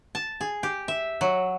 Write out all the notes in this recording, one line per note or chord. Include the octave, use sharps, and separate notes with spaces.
A5
G#4
G4
E5
F#3